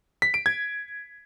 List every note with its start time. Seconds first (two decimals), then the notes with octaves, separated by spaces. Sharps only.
0.22 B6
0.34 D7
0.46 G#6